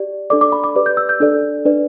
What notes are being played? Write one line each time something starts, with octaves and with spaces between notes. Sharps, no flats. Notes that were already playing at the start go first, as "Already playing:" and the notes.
Already playing: G4 D5
D4 A4 D5 D6
D6
B5
D6
G4 B4 D5
G6
E6
G6
D4 A4 D5
D4 B4 D5